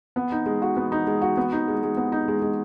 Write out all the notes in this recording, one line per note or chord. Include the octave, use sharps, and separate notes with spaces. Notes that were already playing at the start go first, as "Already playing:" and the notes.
B3
D#4
G#3
F#4
B3
D#4
G#3
F#4
B3
D#4
G#3
G#3
B3
D#4
G#3
G#3